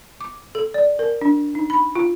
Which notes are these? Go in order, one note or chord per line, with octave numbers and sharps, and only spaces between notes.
D6
A4
D5
A#4
D4
D#4
B5
F4